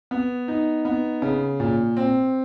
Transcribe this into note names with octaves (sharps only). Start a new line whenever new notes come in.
B3
D#4
B3
C#3
A#2
C4